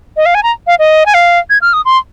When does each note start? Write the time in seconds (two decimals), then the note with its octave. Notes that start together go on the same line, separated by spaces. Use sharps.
0.16 D#5
0.26 F5
0.35 G#5
0.43 A#5
0.67 F5
0.79 D#5
1.06 G#5
1.14 F5
1.50 G#6
1.61 F6
1.73 D#6
1.85 C6